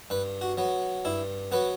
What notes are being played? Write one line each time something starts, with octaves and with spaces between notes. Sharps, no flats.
G2 B4
F#4
F#3 B3
G2 E4
F#3 B3 B4